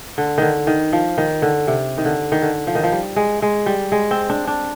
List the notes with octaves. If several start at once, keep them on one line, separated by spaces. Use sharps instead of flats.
D3
D3 D#3
D#3
F3
D#3
D3
C3
D#3
D3
D#3
D3
F3
D#3
F3
G3
G#3
G#3
G3
G#3
C4
D4
D4